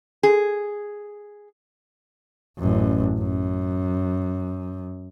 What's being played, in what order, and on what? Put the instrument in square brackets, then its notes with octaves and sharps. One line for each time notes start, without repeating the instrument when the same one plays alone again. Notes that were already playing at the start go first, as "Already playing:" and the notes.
[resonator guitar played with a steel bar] G#4
[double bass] A1 F#2
F#2